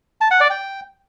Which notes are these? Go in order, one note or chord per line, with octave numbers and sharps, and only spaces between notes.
A5
F#5
D5
G5